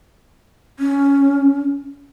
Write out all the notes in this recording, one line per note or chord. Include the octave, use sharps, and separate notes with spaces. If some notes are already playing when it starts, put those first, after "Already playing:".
C#4